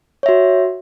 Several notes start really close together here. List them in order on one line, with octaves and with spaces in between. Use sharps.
C#5 E5 F#4